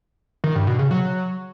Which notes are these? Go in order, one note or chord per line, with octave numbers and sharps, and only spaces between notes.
D#3
G2
B2
C#3
F#3